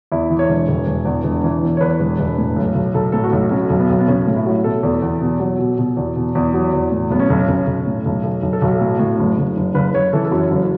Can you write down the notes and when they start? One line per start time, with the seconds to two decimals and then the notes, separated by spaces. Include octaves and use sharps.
0.12 E2 E4
0.30 E3
0.39 C#5
0.49 E1
0.68 E1
0.87 E1
1.05 E2
1.24 E1
1.44 E3
1.63 E2
1.77 C#5
1.81 E2 B4
2.00 E1
2.19 E1
2.38 A2
2.56 B1
2.75 B1
2.94 B1 A4
3.12 A2 A4
3.24 F#4
3.33 B1
3.51 F#3 C#4
3.70 B1
3.79 B3
3.89 B1
3.99 B3
4.08 B1 C#4
4.27 A2
4.36 E4
4.47 F#3
4.64 B2 A4
4.83 E2
5.02 E2
5.21 B2
5.40 F#3
5.59 B2
5.78 B2
5.97 E2
6.16 B2
6.35 E2
6.54 F#3
6.73 E2
6.91 A2
7.10 B1 B3
7.20 C#4
7.30 B1
7.48 B1 C#4
7.67 B1
7.87 A2
8.05 B1
8.23 B1
8.43 B1
8.53 A4
8.62 B1 F#4
8.81 A2
8.99 A2
9.19 F#1
9.38 F#1
9.57 F#1
9.74 F#1 B4
9.95 F#1 C#5
10.13 E3 A4
10.25 A4
10.31 F#2 F#4
10.51 F#1